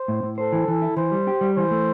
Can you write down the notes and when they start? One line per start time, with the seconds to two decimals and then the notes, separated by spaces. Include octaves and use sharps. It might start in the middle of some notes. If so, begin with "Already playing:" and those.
Already playing: C5
0.08 A2
0.23 A2
0.38 A4 C5
0.53 E3
0.68 E3
0.82 E4
0.97 E3 C5
1.12 G3
1.27 G4
1.41 G3
1.57 E3 C5
1.71 A3